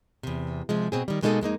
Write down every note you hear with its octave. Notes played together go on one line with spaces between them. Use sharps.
E2 C3
C3 F3 G#3
B2 C4 G#4
D#3 G3
B2 G#3 A#3 D#4 G#4 A4
F2 G#3 A#3 D#4